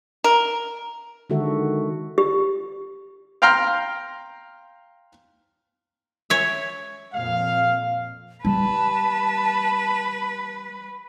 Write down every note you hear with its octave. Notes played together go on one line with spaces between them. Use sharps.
A#4
D3 D#3 G#3 F#4 A4 E5
G4
F5 G5 A#5 C6 F6
C#5 E5
F2 A#2 F5
G3 B4 A5